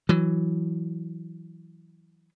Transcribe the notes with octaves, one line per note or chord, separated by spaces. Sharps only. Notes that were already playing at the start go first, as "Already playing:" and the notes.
E3 F#3